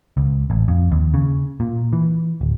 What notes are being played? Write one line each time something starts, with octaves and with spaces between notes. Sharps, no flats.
C#2
A1
F2
D#2
C#3
A#2
E3
D1